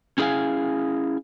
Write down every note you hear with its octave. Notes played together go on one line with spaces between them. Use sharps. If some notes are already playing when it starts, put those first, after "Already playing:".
C#4 E4 G#4 C5 F5 G#5